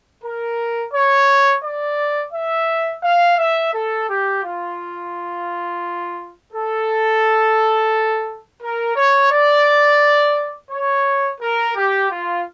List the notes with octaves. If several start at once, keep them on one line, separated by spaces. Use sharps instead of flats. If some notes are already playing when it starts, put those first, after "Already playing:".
A#4
C#5
D5
E5
F5
E5
A4
G4
F4
A4
A#4
C#5
D5
C#5
A#4
G4
F4